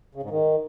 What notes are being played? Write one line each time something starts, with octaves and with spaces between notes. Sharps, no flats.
C#3
G#2
D#3